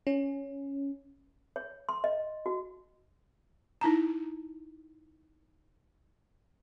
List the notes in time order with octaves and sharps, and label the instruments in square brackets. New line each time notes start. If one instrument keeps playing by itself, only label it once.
[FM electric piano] C#4
[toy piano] C#5
C6
D#5
F#4
[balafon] D#4 E4 A5 A#5